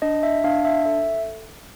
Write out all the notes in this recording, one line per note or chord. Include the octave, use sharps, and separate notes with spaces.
D4 D#5
E5
D4 F5
E5
A4 E5